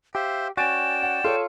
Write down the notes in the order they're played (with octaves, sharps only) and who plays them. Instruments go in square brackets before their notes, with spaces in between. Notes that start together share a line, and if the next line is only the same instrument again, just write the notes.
[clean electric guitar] G4 [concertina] C5 E5 C6 [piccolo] F5
[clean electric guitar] C#4 F#4 [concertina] D5 G5 [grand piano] G#5 A6 D7 [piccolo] E7
[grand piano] F#5
[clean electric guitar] F4 [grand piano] A4 C#5